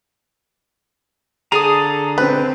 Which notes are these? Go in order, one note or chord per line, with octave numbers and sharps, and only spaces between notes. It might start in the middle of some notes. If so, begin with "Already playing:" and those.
D3 G#4 A4 A#5 D#6
C4 B4